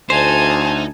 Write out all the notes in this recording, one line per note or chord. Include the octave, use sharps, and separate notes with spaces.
D2 D#4 C5 G#5 A5